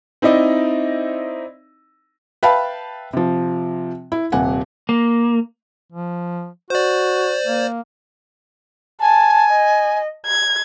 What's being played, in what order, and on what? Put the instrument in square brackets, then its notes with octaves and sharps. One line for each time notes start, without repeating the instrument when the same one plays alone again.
[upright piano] C4 D#4 E4 D5 D#5
[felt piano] B4 E5 F5 G5 A5 B5
C3 F3
E4
D#1 C3 F#5 G#5
[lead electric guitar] A#3
[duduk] F3
[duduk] F#4 [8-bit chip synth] C5 D5
[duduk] A#3
[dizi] G#5 [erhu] A5
[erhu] D#5
G#6